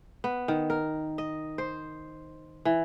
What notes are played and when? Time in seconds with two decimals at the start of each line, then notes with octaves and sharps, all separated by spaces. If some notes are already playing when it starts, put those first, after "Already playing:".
0.24 B3
0.48 D#3
0.70 A#4
1.18 D#5
1.58 C5
2.65 E3